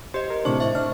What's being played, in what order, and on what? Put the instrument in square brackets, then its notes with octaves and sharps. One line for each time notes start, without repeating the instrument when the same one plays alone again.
[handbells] G4 D#5 [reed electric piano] C5
[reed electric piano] A#4
[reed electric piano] A2 C3 D4 [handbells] C5 C#6
[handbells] E5 C#6
[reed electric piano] D4 [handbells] F6